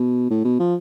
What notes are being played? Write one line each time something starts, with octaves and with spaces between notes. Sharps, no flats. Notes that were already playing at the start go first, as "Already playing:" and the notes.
Already playing: B2
A2
B2
F3